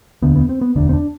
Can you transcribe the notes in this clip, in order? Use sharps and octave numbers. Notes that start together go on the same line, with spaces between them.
E1 D2 D3 B3
B3
C4
B3
E1 D2 D3 D4
C4
D4